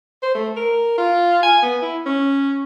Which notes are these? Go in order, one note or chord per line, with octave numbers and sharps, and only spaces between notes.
C5
A3
A#4
F4
G#5
B3
E4
C#4